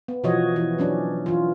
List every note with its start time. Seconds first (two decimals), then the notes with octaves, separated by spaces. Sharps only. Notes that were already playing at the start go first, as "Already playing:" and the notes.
0.08 B3
0.24 B2 E3 F3 F#4 C#5 D#5
0.56 E3
0.79 F#3 C#4 D4
1.26 E3 F4